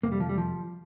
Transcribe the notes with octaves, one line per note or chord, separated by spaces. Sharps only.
F2 C3 A#3
G3
F3
G3
F3